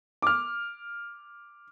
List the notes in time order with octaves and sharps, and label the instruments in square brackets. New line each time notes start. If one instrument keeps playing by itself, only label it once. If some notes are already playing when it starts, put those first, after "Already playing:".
[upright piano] D6 F6